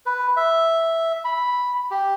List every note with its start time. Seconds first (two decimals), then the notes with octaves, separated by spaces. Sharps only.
0.06 B4
0.37 E5
1.25 B5
1.91 G4